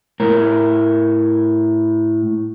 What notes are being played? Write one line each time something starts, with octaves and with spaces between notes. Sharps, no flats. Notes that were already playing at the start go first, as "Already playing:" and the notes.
A2 A#4